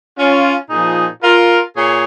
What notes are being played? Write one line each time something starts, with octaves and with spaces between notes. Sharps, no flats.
C#4 F4
A#2 F3 D#4 G#4
F4 A#4
A#2 G#4 C#5